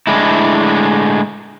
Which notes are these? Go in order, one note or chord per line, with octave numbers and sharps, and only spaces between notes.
A2 D3 G#3 E4